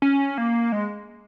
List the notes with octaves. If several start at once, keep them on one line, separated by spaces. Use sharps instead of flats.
C#4
A#3
G#3